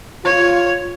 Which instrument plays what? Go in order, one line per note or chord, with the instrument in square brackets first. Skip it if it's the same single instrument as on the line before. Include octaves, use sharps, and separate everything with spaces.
[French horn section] F4 [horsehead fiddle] C#5